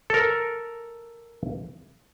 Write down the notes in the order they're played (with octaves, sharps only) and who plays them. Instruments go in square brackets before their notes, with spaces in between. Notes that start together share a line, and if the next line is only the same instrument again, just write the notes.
[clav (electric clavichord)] A4 A#4